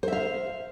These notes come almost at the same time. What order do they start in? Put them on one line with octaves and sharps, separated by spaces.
C5 E5 F5